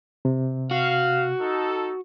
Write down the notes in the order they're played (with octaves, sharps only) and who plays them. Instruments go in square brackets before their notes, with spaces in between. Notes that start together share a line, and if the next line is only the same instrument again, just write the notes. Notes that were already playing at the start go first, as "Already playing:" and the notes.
[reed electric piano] C3
[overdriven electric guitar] F#4 [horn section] F5
[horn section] D#4 A4